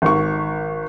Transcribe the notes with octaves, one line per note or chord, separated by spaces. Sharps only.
G#1 C#6